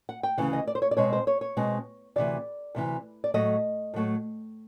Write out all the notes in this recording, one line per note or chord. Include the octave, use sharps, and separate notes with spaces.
F#5
G5
D2 C#3 E3
D#5
D5
C5
C#5
D5
B2 G#3 C4 C#5
C5
C#5
C#5
B2 G#3 C4
D2 C3 E3 D5
D2 C3 E3
D5
A2 F#3 A3 D#5
A2 F#3 A3